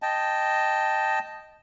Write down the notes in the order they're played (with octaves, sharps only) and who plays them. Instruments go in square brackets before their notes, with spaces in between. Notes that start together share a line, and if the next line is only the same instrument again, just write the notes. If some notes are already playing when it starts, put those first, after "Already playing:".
[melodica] D#5 G5 A5